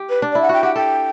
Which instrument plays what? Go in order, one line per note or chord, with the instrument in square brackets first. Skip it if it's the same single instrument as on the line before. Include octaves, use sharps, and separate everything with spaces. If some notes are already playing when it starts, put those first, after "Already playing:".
Already playing: [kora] G4
[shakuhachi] B4
[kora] D4
[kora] E4 [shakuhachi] D5
[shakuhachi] F#5
[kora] F#4 [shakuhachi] G5
[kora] G4 [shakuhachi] F#5
[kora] A4 [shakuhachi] G5